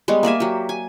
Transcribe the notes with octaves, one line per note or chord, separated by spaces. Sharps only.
G3 G#3 B3 C#5
A#3 D5 E5 G#5
F#3 G4
G#5